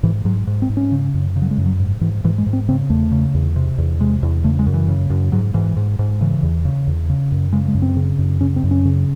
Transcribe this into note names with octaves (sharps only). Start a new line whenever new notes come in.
G#2 E3
G#2 F#3
G#2
C4
G#2
C#4
C#3
F#2
C#3
F#3
G#3
F#2
F#3
G#2
G#2 E3
G#2 E3
G#3
G#2
C4
C#3 C4
E2 A3
C#3
E2
C3
E2
C3 G#3
E2
C#3 A3
G#3
F#2
E3
C#3
F#2
G#2 F#3
G#2 E3
G#2
G#2
C#3 E3
E2
C#3
E2
C#3
F#2
C#3 G#3
G#3
F#2
C4
C#3
F#2
C#3 C#4
C4
F#2
C#4
C#3